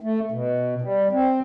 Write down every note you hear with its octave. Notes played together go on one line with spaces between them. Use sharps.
A3
B2
G3
C4